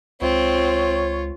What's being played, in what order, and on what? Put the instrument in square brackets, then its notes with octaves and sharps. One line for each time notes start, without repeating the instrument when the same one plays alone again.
[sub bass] C#2 [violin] C4 [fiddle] F4 [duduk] C#5